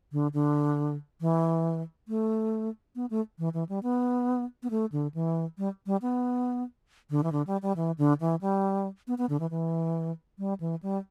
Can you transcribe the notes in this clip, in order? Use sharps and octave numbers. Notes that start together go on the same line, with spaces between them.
D3
D3
E3
A3
B3
A3
E3
E3
G3
B3
B3
A3
D3
E3
G3
G3
B3
D3
E3
D3
G3
G3
E3
D3
E3
G3
B3
B3
D3
E3
E3
G3
E3
G3